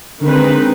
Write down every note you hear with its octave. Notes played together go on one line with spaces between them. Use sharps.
D3 D#3 G#3 C4 D#4 B4